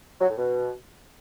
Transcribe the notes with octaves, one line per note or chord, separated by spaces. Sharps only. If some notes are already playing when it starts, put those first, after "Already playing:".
F#3
A2
B2